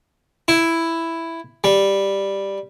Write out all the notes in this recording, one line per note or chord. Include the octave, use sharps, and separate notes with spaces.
E4
G3